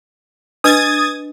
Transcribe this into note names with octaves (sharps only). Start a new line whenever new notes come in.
D4 B4 D#5 D#6 G#6 A6